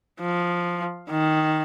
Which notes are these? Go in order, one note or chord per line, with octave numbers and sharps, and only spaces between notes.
F3
D#3